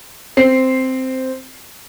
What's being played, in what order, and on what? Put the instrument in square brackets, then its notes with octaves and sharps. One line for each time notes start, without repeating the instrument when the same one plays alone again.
[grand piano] C4 C7